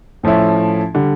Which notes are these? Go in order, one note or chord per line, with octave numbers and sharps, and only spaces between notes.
A2 F3 A3 C#4 E4
D3 G3